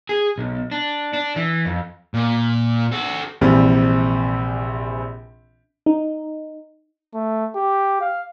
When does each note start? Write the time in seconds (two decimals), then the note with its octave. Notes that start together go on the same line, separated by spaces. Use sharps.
0.09 G#4
0.38 B1
0.71 D4
1.13 D4
1.36 E3
1.65 F2
2.14 A#2
2.92 F#4 A4
3.41 A#1 C3 E3 G3 C4
5.86 D#4
7.14 A3
7.55 G4
8.00 F5